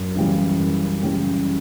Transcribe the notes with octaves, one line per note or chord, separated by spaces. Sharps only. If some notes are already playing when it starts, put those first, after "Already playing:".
Already playing: F#2
C#3 E3 G3 C#4
F#2
C#3 E3 G3 C#4